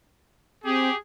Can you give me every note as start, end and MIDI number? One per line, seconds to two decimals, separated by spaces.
0.65 0.89 60
0.65 0.95 67
0.65 0.95 68